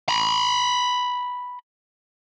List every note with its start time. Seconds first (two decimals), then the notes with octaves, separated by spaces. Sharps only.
0.09 A#5 B5